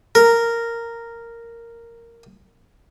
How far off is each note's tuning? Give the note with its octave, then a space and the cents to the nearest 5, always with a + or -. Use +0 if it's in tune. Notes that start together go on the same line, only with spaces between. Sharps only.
A#4 -5